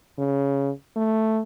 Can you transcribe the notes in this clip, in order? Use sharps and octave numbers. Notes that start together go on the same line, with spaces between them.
C#3
A3